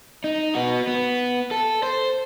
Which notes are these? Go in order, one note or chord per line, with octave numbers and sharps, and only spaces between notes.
D#4
B3 F#4
B3
A4
C5